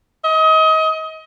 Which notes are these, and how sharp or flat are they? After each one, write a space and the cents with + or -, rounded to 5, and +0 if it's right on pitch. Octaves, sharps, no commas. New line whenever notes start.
D#5 +30